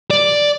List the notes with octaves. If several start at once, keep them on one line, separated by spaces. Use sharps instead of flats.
D5